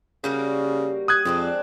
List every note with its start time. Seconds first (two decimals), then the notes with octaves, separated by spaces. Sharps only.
0.24 C#3 G3 A#3 F#4
1.08 D#6 F#6 G#6
1.25 F2 G#3 C4 D4